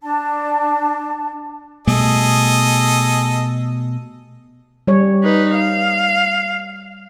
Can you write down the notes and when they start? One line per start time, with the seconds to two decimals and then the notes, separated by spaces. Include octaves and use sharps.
0.02 D4 A5
1.87 B2 G3 A3 G#4 A4 D#5
4.87 G3 C#5
5.24 D#4 B4
5.55 F5